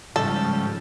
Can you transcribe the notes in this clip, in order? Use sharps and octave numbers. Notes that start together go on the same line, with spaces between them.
G#2 C#3 F3 G3 A4